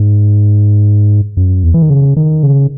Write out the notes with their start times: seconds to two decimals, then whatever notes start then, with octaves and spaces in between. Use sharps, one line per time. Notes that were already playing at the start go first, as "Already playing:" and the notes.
Already playing: G#2
1.37 F#2
1.64 E2
1.74 E3
1.82 D#3
1.90 C#3
2.17 D#3
2.43 C#3